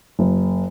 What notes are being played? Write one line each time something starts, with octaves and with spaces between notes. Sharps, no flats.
F#1